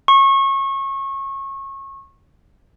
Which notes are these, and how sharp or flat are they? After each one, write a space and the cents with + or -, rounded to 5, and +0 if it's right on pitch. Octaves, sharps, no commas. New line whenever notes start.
C#6 -25